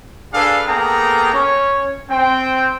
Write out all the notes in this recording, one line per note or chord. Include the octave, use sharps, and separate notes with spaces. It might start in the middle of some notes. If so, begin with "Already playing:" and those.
D4 G#4 A4 B4 F5
A#3 B3 G#4 A4 G5 A#5
C#4 C#5
C4 G5